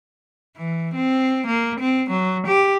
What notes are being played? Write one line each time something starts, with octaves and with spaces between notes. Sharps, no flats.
E3
C4
A#3
C4
F#3
G4